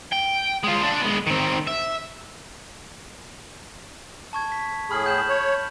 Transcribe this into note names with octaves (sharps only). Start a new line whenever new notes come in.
G5
G#3 F4
D4 C5
G#3 B3
D#3 C4
E5
A5 C#6 G#6
B6
A2 G#4 B5 F6 F#7
G6 E7 F#7
C#5